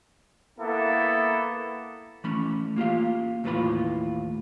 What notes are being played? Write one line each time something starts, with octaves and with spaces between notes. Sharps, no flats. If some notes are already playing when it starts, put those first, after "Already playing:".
A#3 B3 E4 A4
E3 A3 C#4 B5
A#3 F4 G4 F5
D#2 A2 E3 F4 B4 B5